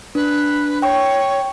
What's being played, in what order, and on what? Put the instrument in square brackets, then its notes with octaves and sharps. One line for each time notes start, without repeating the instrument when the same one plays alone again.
[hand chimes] D4 [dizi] B4
[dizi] C#5 [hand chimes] G5 C#6